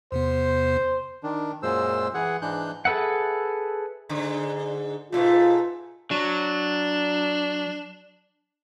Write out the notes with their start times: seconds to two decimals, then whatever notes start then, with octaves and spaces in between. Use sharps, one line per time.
0.12 E2 C3 B3 C5
1.23 D#3 D4
1.63 F#2 A#2 G#3 C5 E6
2.14 E3 G#4 F#5
2.42 G#2 E3 G#3 D4 F#6 G6
2.85 G#4 A4 B4 E5 F#5
4.09 G#2 D3
5.12 G#2 B2 A3 F4
6.11 F#3 D4